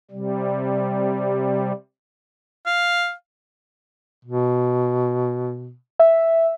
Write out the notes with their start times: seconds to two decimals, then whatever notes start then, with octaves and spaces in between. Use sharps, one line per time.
0.11 C3 G3
2.66 F5
4.25 B2
5.99 E5